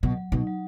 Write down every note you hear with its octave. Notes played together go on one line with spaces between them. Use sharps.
B2 F#3
F#3
B2 D#4
F#3